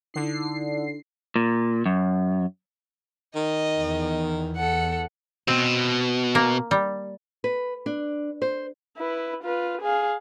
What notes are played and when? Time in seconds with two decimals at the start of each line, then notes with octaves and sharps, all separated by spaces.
0.14 D3 D#4 E4 C7
1.36 A#2
1.86 F#2
3.35 D#3 D#5
3.74 E2
4.56 A4 F#5
5.48 B2 C4
6.35 A#3
6.71 G3
7.44 B4
7.86 D4
8.42 C5
8.97 E4 B4
9.44 F4 B4
9.82 G#4 F5